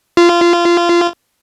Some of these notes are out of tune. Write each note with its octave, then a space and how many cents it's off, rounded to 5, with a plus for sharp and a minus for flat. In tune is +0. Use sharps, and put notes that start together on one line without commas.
F4 -20